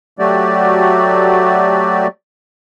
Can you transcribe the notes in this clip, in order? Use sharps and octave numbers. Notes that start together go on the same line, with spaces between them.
F#3 A3 F#4 G4 D5